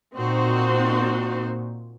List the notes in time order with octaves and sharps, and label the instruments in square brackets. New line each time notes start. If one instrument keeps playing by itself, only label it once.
[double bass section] A#2 [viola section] C4 D#4 F#4 C5